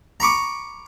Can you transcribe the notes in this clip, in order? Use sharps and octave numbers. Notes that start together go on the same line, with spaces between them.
A#5 B5 C#6 D6